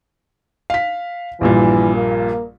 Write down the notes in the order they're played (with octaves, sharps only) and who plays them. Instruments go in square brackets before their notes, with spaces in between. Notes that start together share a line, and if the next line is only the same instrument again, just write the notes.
[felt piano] F5 B6
[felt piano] A#1 G2 A#2 [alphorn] E3
[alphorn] A#3